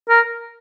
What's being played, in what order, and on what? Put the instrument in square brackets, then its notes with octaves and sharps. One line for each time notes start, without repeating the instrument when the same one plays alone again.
[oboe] A#4